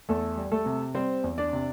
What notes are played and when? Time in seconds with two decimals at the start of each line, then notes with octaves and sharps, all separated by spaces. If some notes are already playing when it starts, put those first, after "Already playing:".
0.09 E2 A3 A4
0.37 G3
0.52 A3 A4
0.66 C3
0.95 G3 C4 C5
1.24 E2
1.38 D4 D5
1.53 C3